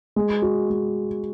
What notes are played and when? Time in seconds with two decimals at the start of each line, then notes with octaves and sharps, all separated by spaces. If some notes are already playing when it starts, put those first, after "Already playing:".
0.16 G#3
0.42 F#4
0.70 G#3